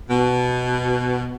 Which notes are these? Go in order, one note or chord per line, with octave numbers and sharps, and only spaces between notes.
B2